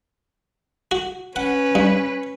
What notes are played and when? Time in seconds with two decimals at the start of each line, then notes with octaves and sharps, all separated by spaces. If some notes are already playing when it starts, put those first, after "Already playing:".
0.91 F#4
1.36 C#4 B4 F#5
1.75 G2